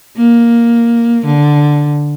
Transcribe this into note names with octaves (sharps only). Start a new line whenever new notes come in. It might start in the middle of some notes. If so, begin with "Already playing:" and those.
A#3
D3